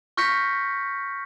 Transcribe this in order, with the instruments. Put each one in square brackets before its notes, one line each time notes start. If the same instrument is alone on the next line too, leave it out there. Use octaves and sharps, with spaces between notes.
[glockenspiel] C#6 F6 G6 A#6 B6 C#7